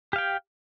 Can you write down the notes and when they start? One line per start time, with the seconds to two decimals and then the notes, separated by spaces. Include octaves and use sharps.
0.13 G4
0.16 F5
0.18 G5